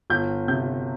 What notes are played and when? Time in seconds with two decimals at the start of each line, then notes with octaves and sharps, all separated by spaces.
0.10 G1 G6
0.48 C3 G6